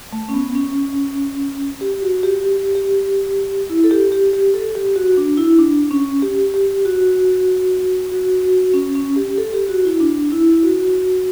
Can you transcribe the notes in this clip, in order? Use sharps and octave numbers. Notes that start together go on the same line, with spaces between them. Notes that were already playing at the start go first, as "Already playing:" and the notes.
A3
C#4
B3
C#4
G4
F#4
G4
G4
G4
E4
A4
G4
G4
G4
A4
G4
F#4
D4
E4
D4
C#4
G4
G4
F#4
F#4
F#4
C#4
C#4
G4
A4
G4
F#4
E4
D4
E4
F#4